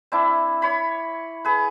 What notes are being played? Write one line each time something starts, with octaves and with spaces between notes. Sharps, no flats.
C4 D4 E4
C#5 B5
G#4 B4